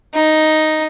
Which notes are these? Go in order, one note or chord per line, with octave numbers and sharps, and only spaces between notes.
D#4